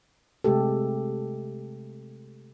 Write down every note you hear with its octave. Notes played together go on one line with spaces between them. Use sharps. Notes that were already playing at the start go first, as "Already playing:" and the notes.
C3 G#3 A3 G4 A4